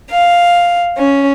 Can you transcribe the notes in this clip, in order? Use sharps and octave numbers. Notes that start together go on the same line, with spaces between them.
F5
C#4